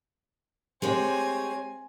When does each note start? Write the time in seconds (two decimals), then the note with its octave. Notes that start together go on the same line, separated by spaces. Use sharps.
0.82 G#3 C4 G4 C#5 G#5